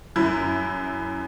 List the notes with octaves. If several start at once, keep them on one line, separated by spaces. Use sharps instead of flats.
F#2 E4